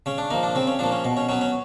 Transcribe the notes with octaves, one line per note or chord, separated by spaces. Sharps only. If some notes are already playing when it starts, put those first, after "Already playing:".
C#3 C#4
D4
F3 A#3 D#4
D4
C#3 C4
C#4
F3 A#3 D4
C#4
B2
C#4
F#3 B3 C#4
C#4